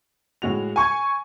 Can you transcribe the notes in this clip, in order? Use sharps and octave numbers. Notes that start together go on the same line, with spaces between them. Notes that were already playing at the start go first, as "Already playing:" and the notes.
A2 G#3 F#4 F7
G#5 C#6 G#6